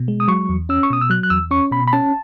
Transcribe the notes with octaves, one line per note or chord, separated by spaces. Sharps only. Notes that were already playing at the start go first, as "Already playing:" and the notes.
Already playing: B2
G#3
D#6
F#3 C#6
E2
C#4 E6
C#6
B2 D#6
E6
F#3 F#6
F#6
E2 E6
C#4 C#6
B2 B5
B5
C#4 A5